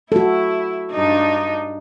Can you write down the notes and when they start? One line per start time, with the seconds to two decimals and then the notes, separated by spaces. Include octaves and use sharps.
0.12 E4 F#4 A4
0.91 G2 D4 D#4